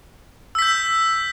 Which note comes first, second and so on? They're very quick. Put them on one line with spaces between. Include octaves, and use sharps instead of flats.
E6 B6 G6